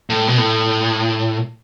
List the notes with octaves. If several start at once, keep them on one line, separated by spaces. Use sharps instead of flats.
A2
B2
A2